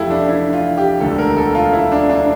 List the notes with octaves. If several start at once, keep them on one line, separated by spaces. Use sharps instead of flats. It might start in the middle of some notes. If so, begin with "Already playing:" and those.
Already playing: F1 F2 E3 A3 E4 F4 G4 A4
D4
E4
F4
G4
E1 D2 D3 A4
A#4
A4
F4
E4
D4
D4